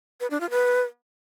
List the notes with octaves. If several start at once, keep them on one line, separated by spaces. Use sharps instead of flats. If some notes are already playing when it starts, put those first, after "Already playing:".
B4
D4
F4
B4